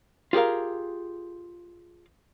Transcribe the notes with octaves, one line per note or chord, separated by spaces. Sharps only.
F4 G4 G#4 A#4 F5